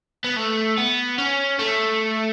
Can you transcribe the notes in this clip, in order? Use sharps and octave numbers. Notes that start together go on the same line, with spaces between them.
B3
A3
B3
C#4
A3